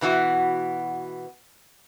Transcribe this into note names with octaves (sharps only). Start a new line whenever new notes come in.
B2 E3 B3 F#4